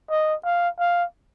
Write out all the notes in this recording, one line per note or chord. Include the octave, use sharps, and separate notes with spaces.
D#5
F5
F5